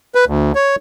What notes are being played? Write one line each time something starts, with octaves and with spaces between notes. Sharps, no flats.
B4
D2
C#5